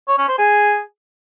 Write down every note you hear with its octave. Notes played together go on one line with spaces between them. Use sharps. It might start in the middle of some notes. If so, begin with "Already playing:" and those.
C#5
C#4
C5
G#4